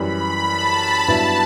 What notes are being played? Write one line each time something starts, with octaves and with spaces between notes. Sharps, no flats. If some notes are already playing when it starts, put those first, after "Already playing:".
Already playing: F#2 E3 G3 B5
A5
G2 F#3 B3 E4 A5